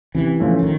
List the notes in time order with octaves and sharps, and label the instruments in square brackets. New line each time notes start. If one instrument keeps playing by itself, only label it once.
[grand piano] C3 [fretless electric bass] E3
[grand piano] F3 A3 C#4
[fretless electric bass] D#3